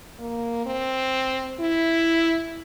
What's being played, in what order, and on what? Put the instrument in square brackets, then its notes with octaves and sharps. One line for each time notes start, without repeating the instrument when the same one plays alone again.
[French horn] A#3
C4
E4